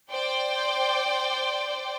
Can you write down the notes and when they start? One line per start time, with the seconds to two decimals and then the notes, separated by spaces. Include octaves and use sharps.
0.11 C5 D5 G5